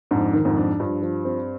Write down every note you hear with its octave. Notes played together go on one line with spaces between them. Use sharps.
F2 G#2 D4
D#3
F2 G#2
D4
G2 F3
F3
C4